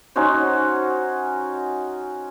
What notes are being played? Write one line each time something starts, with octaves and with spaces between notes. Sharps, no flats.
C#4 D#4 F#4 C5